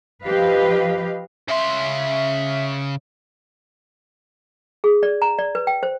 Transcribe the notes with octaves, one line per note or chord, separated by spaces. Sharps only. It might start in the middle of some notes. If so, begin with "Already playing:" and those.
F3 G4 B4 D#5 F5
C#3 E5 C6
G#4
D5
A#5
D5
B4
G5
C5